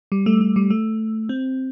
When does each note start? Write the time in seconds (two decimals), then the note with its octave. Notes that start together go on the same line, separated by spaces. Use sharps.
0.12 G3
0.26 A3
0.41 A3
0.56 G3
0.70 A3
1.29 C4